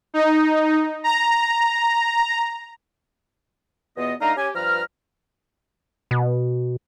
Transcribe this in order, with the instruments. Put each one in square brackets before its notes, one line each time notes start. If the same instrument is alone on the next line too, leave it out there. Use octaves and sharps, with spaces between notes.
[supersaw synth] D#4
A#5
[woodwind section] E2 B2 B3 F4 D#5
A3 D4 D#4 D#5 F5 A#5
C#4 G4 G#5
G2 F3 B4 A#5 F6
[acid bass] B2